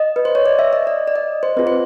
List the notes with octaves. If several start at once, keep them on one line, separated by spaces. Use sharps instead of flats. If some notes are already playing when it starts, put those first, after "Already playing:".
Already playing: D#5
B4
C5
C#5
D5
E5
D#5
D5
D5
D#5
C5
C4 F4 G#4 B4
C5